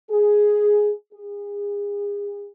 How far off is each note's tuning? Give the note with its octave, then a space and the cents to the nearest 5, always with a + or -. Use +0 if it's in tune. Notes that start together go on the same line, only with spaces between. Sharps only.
G#4 +0
G#4 -35